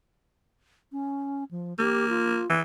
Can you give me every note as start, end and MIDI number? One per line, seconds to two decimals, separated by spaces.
0.92 1.44 61
1.51 1.74 53
1.79 2.42 58
1.79 2.06 67
2.09 2.47 65
2.50 2.61 52